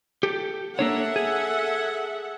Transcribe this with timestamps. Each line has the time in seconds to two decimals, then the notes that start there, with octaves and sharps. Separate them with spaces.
0.23 G4 A4
0.79 A#3 D4 A4 C#5 E5 F#5
1.16 G#4